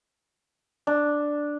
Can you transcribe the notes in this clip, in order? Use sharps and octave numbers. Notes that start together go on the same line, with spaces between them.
D4